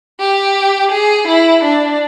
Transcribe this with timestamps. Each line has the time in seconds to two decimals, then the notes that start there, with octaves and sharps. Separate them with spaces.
0.20 G4
0.91 G#4
1.28 E4
1.64 D4